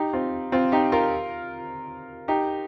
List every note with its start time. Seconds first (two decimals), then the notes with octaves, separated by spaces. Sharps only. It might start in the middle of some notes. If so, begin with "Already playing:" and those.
Already playing: D#4 G4
0.13 C4 F4
0.52 C4 F4
0.72 D#4 G4
0.92 F4 A#4
2.28 D#4 G4